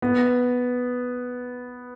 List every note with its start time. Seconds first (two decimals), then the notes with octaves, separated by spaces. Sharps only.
0.02 B3